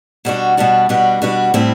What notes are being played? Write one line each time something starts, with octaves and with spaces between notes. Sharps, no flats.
B2 G3 D4 F#4
B2 G3 D4 F#4
B2 G3 D4 F#4
B2 G3 D4 F#4
A2 G3 C4 E4